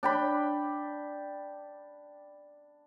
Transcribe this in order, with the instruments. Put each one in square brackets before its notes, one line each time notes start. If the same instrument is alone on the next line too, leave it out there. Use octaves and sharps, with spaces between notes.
[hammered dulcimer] D4 G5 B5